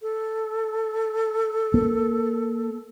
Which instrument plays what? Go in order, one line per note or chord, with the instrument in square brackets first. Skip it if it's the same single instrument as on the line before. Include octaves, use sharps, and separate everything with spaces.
[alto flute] A4
[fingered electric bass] A#3